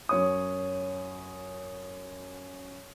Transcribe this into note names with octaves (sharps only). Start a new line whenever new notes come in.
F#2 C#5 D#6